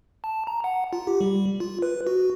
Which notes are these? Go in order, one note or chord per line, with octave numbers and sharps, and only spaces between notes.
A5
A#5
F#5
F4
G4
G3
F4
B4
F#4